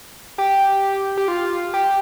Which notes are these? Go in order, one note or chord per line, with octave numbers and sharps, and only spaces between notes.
G4
G4
F4
G4